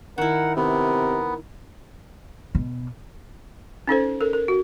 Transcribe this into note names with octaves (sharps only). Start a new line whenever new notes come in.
D#3 E4 A#4 F#5
C3 B3 A#4
B2
C#4 D#4 A4 C5
A4 A#4
A#4
F#4